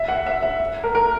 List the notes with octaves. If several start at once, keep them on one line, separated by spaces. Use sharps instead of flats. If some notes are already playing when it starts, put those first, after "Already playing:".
Already playing: E5
F#5
E5
E5
A#4
A#4